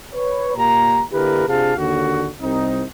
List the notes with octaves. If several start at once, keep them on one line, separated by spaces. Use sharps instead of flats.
B4 C#5
A#2 A#3 G4 A#5
D3 A#3 E4 G4 A#4 B4
C3 D4 F4 G#4 F5 A5
D#2 D3 F#4
C2 C4 D#4